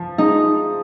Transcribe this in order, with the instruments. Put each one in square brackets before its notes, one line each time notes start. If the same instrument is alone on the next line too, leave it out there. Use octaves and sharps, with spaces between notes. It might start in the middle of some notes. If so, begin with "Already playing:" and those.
Already playing: [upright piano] F3
[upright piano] G#3 [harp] D#4